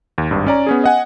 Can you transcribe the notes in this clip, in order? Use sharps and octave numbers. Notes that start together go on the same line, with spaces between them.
D#2
G#1 G2
C#4 D5 A#5
B3 C#4 G#4
D#5 F#5 G#5